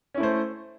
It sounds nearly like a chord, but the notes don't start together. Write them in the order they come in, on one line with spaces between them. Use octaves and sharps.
C#4 E4 A3 C5